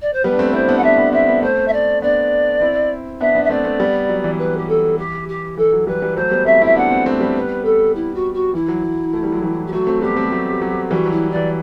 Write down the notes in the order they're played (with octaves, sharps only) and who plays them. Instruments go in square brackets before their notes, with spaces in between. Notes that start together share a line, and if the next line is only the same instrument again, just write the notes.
[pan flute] D5
C5
[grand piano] G3 B3 [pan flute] B4
[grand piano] D4
A3 C4
[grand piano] C4 E4 [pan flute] C5
[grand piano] B3 D4
[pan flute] F#5
[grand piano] B3 D4 [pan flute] E5
[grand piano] B3 D4
[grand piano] C4 E4 [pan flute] E5
[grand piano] B3 D4
[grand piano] A3 C4 [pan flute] C5
[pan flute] E5
D5
[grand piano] B3 D4 [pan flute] D5
[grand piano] C4 E4
[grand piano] B3 D4 [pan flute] E5
[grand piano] B3 D4
[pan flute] E5
[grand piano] A3 C4 [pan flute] D5
[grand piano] A3 C4
G3 B3
F#3
E3
[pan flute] B4
G4
A4
G4
G4
[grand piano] E3 [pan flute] A4
[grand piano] F#3
[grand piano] E3 G3 [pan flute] B4
[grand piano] E3 G3
[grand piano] F#3 A3 [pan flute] C5
[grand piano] G3 B3
[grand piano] A3 C4 [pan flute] E5
[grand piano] C4 E4 [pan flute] E5
[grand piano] B3 D4 [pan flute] F#5
[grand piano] A3 C4
A3 C4
G3 B3
[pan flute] B4
A4
E4
F#4
F#4
[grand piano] E3 [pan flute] E4
[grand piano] F#3
F#3
A3
G3
F#3
E3 G3
[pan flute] G4
[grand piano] F#3 A3 [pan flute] F#4
[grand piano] A3 C4
[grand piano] G3 B3 [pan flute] G4
[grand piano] A3 C4
F#3 A3
F#3
[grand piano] E3 G3 [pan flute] F#4
[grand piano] F#3 [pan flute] E4
[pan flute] D5
[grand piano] E3